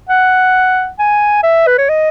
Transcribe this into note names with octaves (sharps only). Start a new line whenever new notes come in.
F#5
G#5
E5
B4
C#5
D#5